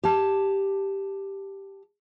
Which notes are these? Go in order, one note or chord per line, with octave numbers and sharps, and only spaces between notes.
G4 A5